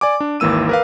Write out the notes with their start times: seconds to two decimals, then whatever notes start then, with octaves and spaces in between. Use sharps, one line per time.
0.01 D5 G#5 D6
0.20 D4
0.40 G#1 D#2 E3 A#3 E6 D#7
0.69 A#4 B4 F5